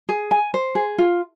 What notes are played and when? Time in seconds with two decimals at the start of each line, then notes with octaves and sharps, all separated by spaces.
0.09 G#4
0.31 G#5
0.54 C5
0.75 G#4
0.98 F4